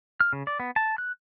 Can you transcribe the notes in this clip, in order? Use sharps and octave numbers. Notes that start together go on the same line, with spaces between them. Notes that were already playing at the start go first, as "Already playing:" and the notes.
F6
C#3
D5
B3
A5
F#6